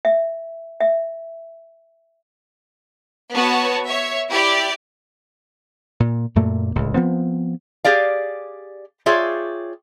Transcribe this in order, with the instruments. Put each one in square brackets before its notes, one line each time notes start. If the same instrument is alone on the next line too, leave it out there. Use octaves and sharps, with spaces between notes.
[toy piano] E5
E5
[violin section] B3 F#4 C#5 A5
C#5 E5
E4 G4 D5
[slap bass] A#2
F#2 A#2 A3 A#3
D1 C#2 A2
F3 B3 C4
[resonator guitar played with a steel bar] G4 G#4 D5 F5
F4 G#4 C#5 D5 E5 G5